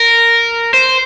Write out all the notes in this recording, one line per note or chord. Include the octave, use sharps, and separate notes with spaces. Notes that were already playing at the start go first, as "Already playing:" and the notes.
Already playing: A#4
C5